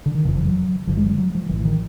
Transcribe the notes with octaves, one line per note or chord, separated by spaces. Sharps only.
D3
D#3
F#1 F2 C#3 E3
F3
F#3
F#1 F#2 D3 F3
G#3
G3
F#3
F3
A#1 A2 E3
D#3